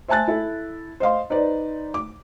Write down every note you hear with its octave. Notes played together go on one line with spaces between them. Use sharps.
C5 E5 G#5 A5 F#6 A6
E4 A4 E5
C5 D#5 F5 C6
D#4 B4 C5 D5
D6